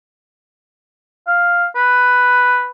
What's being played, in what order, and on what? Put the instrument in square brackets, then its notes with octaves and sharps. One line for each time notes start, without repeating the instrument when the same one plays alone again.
[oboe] F5
B4